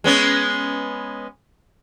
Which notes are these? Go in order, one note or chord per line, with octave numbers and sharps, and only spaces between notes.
G#3 B3 C#4